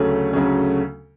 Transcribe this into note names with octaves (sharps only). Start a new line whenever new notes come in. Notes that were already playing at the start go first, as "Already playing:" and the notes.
Already playing: D2 C#3 F#3 A3 C#4
D2 C#3 F#3 A3 C#4